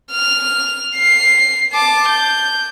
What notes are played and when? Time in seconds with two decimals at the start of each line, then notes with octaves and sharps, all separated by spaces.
0.12 F6
0.96 C7
1.73 A5 D6
2.09 G6